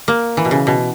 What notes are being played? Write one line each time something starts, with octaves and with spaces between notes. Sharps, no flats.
A#3
E3
B2
C#3
B2